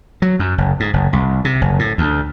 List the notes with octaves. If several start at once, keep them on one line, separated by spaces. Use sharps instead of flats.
F#3
F#2
F#1
G#2
F#1
C2
C3
F#1
A2
D2